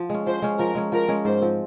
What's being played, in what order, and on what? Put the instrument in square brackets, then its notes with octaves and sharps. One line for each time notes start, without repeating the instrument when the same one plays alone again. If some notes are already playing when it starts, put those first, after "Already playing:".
Already playing: [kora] F3
G#3 C#4
[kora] F3 [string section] C5
[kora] G#3 C#4
[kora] F3 [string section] A#4
[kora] G#3 C#4
[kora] F3 [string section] A#4
[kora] G#3 C#4
[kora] G#2 [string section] C5
[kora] F3 C4